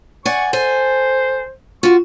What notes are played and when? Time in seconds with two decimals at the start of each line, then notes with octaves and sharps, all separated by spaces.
0.25 D5 F#5 G#5 C#6
0.53 A4 C5 G#5
1.83 F4 F#4 C#6